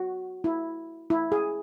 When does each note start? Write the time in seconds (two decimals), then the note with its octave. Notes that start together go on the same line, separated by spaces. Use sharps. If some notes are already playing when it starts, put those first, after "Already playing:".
Already playing: F#4
0.44 E4
1.10 E4
1.32 G#4